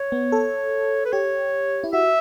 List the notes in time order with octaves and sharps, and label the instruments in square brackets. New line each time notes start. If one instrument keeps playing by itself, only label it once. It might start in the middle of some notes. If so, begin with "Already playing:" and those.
Already playing: [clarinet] C#5
[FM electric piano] B3
A4
[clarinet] B4
[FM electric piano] G4 [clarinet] C#5
[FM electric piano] E4
[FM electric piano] F#4 [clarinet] E5